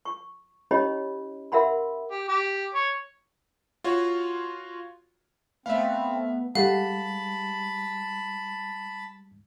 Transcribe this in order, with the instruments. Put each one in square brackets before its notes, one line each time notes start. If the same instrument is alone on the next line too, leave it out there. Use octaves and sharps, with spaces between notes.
[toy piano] C#6
C#4 E4 G4 C#5 D#5 B5
A#4 E5 F#5 B5 C6
[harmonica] G4
G4
C#5
[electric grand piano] F4 F#4 C#5
[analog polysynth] A3 B3 [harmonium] C4 [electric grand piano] E5 F5
[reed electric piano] G3 G#3 [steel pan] G4 A4 F#5 [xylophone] F5 [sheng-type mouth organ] A5 B5